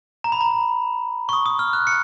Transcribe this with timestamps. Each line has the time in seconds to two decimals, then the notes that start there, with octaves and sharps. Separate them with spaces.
0.24 A#5
0.32 B5
0.41 A#5
1.29 C#6
1.33 D#6
1.46 D#6
1.59 F6
1.73 F#6
1.87 C#7